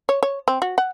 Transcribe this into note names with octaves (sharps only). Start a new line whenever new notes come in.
C#5
C#5
C4
F#4
F#5